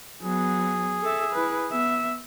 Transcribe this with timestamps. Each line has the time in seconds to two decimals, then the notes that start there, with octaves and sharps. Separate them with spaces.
0.22 F#3 B3 G#4
1.03 A4 E5
1.32 E4 B4
1.70 B3 E5